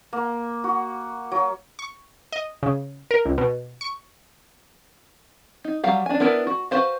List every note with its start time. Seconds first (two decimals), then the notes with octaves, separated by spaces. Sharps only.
0.13 A#3
0.64 F#4
1.32 F#3
1.79 C#6
2.32 D#5
2.63 C#3
3.11 A#4
3.26 C#2
3.38 B2
3.81 C#6
5.64 D#4
5.84 F#3 G3 F5 F#5
6.06 D4 G#5
6.20 B3 D4 E4 A#4 B4
6.47 F#4
6.71 F#4 B4 C5 F5